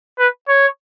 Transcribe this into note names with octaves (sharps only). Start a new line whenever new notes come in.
B4
C#5